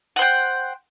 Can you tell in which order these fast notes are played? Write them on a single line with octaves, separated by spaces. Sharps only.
F#5 C5 G5